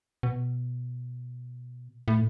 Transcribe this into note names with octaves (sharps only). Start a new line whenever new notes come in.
B2
A2